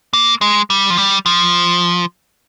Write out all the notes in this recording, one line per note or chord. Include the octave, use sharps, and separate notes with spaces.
A#3
G#3
G3
F3
G3
F3